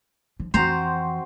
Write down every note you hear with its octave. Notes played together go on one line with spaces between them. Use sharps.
F3
F2 E3 C4 F#4 C5 A#5